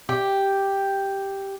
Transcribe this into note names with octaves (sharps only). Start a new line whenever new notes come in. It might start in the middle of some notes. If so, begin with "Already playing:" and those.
G4